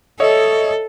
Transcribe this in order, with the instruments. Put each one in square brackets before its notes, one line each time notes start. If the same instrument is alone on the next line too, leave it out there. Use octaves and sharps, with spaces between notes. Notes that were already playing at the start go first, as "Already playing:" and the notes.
[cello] A4 [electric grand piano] C#5 D#5 E5